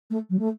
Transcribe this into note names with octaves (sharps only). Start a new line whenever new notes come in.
A3
F#3
A3